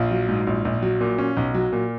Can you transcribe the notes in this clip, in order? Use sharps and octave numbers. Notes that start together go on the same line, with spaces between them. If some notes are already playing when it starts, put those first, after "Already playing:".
Already playing: A#1 F4
F#3
G#2
A#1
A#1
F#3
A#2
C#4
B1
F#3
A#2